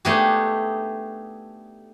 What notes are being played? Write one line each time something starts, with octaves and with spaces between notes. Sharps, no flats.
A3 B3 D4 D#4 G4 G#4